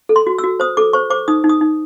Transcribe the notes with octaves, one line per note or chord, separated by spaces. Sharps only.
A4
C6
F#4
E6
F#4
C5 D#6
A4 D6
C5 C#6
C5 D6
D#4 D#6
D#4
D#6
D#4